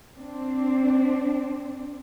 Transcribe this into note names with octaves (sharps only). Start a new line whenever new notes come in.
C4 D4